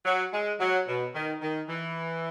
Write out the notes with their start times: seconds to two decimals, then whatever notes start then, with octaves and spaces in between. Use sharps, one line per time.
0.05 F#3
0.33 G#3
0.60 F#3
0.87 B2
1.14 D#3
1.41 D#3
1.68 E3